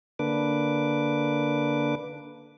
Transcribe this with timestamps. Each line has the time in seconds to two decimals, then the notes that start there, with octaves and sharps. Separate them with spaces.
0.19 D3 A#3 D4 B4 D6